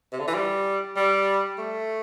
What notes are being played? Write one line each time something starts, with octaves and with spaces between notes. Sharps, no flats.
C3
D3
E3
G3
G3
A3